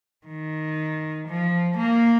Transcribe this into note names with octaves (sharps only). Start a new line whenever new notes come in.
D#3
F3
A#3